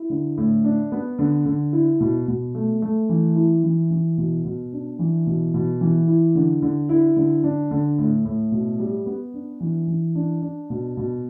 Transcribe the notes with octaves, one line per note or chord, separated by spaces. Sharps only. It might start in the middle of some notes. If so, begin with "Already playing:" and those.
Already playing: E4
D3
A2
D4
B3
D3
D3
E4
B2
B2
A3
A3
E3
E4
E3
E3
B2
B2
D4
E3
B2
B2
E3
E4
D3
D3
E4
D3
D4
D3
A2
A2
B2
G3
B3
D4
E3
E3
D4
D4
B2
B2